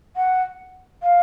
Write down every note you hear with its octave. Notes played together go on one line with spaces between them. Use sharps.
F#5
F5